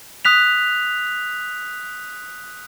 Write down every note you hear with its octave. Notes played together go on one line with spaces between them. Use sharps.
D#6 F#6 B6 F7